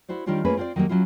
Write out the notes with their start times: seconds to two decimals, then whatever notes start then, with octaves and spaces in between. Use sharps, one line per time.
0.09 E4 F#4 C5 D5
0.26 D#3 G3 D4 F4 G4 C#5
0.45 A3 A#3 C#4 F4 G#4 B4
0.57 C4 F4 G#4 C5 D5
0.76 D#3 F#3 G3 A#3
0.89 F#3 C#4 E4 F4